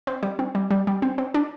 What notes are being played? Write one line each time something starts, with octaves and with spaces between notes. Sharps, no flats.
C4
G3
C4
G3
G3
G3
C4
C4
D4